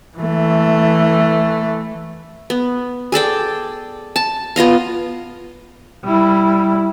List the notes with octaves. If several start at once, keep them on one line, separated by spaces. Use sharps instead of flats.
E3 A3
B3
G#4 A4 D5 G5
A5
B3 F4 D#5 F5
G3 E4